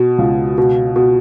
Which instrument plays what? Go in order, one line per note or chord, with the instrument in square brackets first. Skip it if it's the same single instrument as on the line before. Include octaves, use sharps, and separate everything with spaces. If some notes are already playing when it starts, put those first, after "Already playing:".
Already playing: [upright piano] B2
C#2
B2
B2